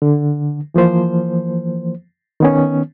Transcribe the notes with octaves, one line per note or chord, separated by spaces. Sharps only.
D3
E3 F3 A#3 C5
D#3 B3 C#4